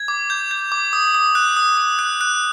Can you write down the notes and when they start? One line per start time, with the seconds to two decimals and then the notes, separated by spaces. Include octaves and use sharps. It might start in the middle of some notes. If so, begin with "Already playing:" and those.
Already playing: G#6
0.08 D6
0.30 G6
0.51 G6
0.72 D6
0.93 D#6
1.15 D#6
1.35 F#6
1.57 D#6
1.77 F#6
1.99 F#6
2.21 F#6